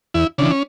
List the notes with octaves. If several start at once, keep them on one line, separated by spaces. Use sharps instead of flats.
E2 E4
C#3 E3 D4
C#4